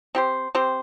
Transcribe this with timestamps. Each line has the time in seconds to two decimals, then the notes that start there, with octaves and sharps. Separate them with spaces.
0.15 C4 G4 C5
0.55 C4 G4 C5